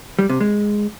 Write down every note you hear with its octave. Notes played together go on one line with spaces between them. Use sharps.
G3
C3
G#3